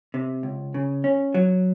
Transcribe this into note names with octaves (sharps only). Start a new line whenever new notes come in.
C3
C#2
C#3
C#4
F#3